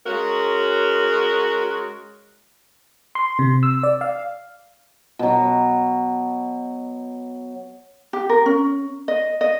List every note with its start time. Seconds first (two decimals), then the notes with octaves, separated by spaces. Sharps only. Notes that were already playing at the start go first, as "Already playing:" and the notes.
0.06 G#3 C#4 F#4 A#4
3.15 C6
3.39 C3
3.63 E6
3.83 D5
4.01 F5
5.19 B2 F#3
8.13 G4
8.29 A#4
8.46 C#4
9.08 D#5
9.41 D#5